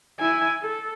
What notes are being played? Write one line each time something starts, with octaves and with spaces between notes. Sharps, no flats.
E4 G#5
A4